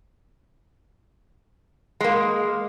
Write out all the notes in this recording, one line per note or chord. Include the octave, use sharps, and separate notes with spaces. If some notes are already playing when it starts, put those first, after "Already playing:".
G#3 A#3